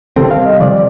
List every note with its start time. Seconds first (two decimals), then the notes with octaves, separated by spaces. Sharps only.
0.16 C3 D#3 G3 C4 A4
0.31 F5
0.46 D#5
0.60 C3 F3 D5